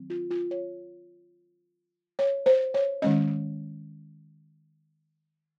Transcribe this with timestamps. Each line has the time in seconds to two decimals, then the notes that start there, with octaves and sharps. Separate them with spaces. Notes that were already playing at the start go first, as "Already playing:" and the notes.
Already playing: D#3 F#3 C4
0.10 F4
0.31 F4
0.51 C#5
2.19 C#5
2.46 C5
2.74 C#5
3.02 D#3 G#3 C#4 D#5